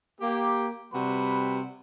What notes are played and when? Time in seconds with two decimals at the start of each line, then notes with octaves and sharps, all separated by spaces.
0.21 A#3 G4
0.92 C3 G3 F#4 B4 B5